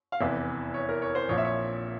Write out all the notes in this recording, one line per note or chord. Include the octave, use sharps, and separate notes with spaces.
F5
F1 E2 E3 E5
C#5
A#4
C#5
C5
A#1 A#2 F3 C#5
E5
C#5